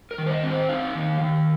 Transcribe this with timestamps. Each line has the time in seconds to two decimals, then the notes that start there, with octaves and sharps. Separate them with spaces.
0.11 A#4
0.18 D#3
0.26 C5
0.31 D#5
0.43 C4
0.50 C5
0.69 D#4 F5
0.95 D#3
1.21 D#3